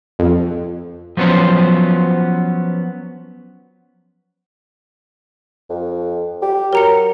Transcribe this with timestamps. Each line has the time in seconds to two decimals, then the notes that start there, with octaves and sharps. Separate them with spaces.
0.19 F2
1.17 F3 F#3 B3 C#4 C5
5.70 F2
6.42 G4
6.73 F#3 A#4 A#5 C#7